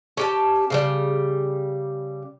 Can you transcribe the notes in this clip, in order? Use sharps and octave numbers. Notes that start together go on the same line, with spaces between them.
C#4 G4 A5
C#3 E3 G3